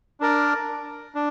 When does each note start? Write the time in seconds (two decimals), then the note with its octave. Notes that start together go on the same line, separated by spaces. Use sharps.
0.20 D4 A#4 D5
1.15 D4